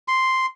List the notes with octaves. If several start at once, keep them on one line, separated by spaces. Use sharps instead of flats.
C6